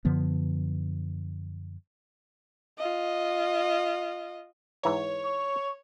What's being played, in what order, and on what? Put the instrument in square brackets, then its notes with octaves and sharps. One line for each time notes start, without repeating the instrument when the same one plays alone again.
[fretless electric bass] F#2 D3 F3 B3
[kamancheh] F4 D#5
[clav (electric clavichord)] G#2 E3 A#5 [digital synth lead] C#5
[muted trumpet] C#6